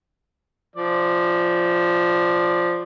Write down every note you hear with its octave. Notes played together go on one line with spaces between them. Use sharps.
F3 D5